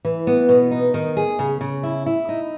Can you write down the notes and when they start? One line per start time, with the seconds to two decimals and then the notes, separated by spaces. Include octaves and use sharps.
0.05 E3
0.27 B3
0.49 B2
0.71 D#4
0.94 D#3
1.17 G#4
1.39 C#3
1.61 C#3
1.83 E4
2.06 E4
2.29 D#4